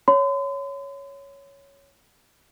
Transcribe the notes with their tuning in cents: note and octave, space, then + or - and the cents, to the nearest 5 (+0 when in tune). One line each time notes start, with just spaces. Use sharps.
C#5 +5 C6 -45